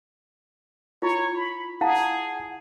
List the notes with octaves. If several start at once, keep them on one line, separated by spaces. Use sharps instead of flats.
E4 F4 C#5
B5
E4 G#4 F5 F#5 A5